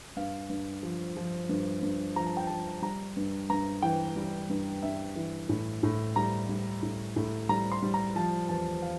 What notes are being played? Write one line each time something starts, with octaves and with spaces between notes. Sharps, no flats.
G2 F5
G2
F3
F3
G2
G2
F3 A#5
A5
G5
F3 A5
G3 A#5
G2
G2 A#5
E3 G5
G3
G2
G2 E5
E3
A2
A2
G3 A#5
G3
A2
A2
G3 A#5
C6
G3
A#5
F3 A5
E2 A5
F5